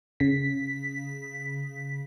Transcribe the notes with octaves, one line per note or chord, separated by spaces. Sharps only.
C#3 B6